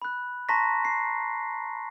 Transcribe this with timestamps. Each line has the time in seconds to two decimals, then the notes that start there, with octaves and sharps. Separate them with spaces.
0.02 B5 F#6
0.49 A5 A#5 C6 C#6 A#6 B6
0.85 C7